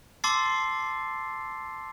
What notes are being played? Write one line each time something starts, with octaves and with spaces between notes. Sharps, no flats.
A5 C6 D6 E6 A6 C7